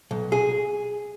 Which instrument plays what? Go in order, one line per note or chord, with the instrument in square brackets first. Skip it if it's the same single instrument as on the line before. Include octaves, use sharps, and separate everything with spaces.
[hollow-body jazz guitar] B1
G#4